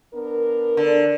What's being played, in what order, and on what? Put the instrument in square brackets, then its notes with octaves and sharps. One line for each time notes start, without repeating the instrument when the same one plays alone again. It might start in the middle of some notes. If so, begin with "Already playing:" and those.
[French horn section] B3 D4 A#4
[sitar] D3